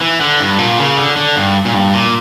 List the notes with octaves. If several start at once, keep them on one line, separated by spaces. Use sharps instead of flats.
E3
D3
G2
A#2
C#3
D3
D3
G2
A#2
G2
A#2